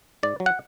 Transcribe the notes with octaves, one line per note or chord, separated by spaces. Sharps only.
G#2 D5
F#3
F#5